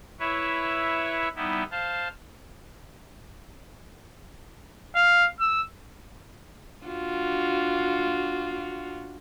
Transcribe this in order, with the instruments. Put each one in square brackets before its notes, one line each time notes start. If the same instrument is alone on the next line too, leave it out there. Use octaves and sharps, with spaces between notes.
[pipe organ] E4 B4 C#5 E5
G3 B3 D#4 E4
C5 F5 A5
[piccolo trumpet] F5
E6
[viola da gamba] D4 F4 F#4